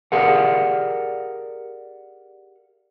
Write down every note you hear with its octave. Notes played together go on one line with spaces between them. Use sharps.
G4 G#4 A#4 D5 F5 F#5